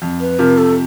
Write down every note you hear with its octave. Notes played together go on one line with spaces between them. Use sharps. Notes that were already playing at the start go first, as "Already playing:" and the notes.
F2
B4
C3 F3 A#4
A4